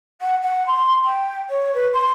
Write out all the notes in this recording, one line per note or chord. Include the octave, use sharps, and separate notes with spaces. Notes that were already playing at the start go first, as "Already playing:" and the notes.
F#5
F#5
C6
G5
C#5
B4
C6